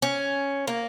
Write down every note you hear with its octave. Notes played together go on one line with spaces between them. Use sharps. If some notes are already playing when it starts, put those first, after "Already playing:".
C#4
A#3